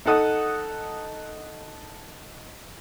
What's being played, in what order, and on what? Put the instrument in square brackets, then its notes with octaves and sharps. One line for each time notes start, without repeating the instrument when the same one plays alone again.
[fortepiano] D#4 A4 F#5 D#6